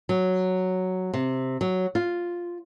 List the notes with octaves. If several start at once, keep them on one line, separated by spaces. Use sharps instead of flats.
F#3
C3
F#3
F4